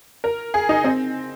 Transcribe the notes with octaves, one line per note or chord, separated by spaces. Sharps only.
A#4
G#4
D#4
C4